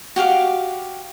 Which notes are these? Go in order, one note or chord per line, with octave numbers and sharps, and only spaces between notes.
F#4 G4 F5 D6